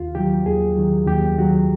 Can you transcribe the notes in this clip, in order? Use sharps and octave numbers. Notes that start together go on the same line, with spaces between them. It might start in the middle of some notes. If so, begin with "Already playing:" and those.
Already playing: D#2 F4
D#3 F#3 G4
D#2 G#4
D#3 F#3
D#2 G4
D#3 F#3 F#4